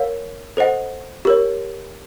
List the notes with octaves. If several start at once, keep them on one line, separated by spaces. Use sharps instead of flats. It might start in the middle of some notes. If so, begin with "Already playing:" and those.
Already playing: A#4 C#5 F5
A4 C5 D#5 F#5
G4 A#4 C#5